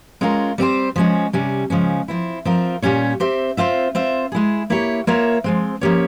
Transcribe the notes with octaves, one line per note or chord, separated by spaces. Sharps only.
G#3 C#4 F4 A#4
G3 C4 E4 G4 C5
F3 G#3 C#4
C3 G3 C#4
C#3 F3 G#3 C#4
F3 C4 E4
F3 C4 F4 A#4
A#2 G3 C#4 G4 C#5
C4 G4 C5 E5
C4 F4 C5 E5
C4 F4 C5 E5
G#3 E4 G#4
A#3 E4 G4 C#5
A#3 F4 A#4 C#5 E5
F3 G#3 C4
F3 A#3 C#4 G4 C#5